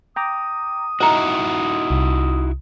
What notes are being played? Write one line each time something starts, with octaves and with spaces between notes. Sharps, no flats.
G5 A#5 D6 D#6
D#4 E4 F#4 C5 D#5 A#5 C#7
C2